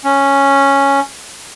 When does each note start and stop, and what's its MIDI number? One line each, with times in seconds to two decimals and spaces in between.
0.04 1.00 61